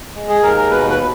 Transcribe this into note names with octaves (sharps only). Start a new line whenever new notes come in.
G#3
G#4
D#2 A#4
A#4
B2 B4
B4
B2